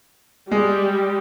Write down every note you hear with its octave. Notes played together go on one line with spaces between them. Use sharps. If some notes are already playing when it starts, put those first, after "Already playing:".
G3 G#3